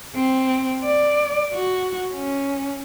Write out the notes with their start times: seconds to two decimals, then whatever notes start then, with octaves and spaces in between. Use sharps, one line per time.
0.16 C4
0.85 D5
1.53 F#4
2.13 C#4